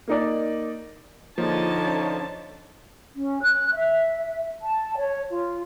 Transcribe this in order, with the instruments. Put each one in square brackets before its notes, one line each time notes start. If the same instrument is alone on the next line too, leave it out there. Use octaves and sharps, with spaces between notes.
[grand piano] A#3 D#4 D5
[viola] D3 A5 [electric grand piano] F3 [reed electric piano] A#3 F4 G#4 [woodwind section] D#4 C#5
[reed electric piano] C#4 D4 C5
[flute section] C#4
F#6
E5
A5
C#5
F4